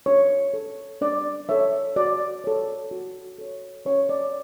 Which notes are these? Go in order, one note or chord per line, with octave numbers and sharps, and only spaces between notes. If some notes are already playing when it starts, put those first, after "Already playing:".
D4 C#5
A4 C#5
D4 D5
A4 C#5 E5
F#4 D5
A4 C#5
F#4
A4 C#5
C#4 C#5
D5